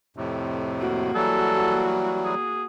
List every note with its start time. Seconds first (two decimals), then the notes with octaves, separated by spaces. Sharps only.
0.17 F2 A2 C3
0.80 A#3 F#4
1.15 E3 F#3 G3 A4
2.24 G#4